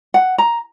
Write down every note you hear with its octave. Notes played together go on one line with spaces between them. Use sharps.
F#5
A#5